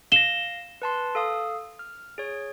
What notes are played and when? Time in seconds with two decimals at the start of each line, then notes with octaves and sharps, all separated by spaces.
0.12 F5 A#6 E7 G7
0.82 B4 A5 C6
1.15 A4 F5 D#6
1.79 F6
2.18 G#4 C#5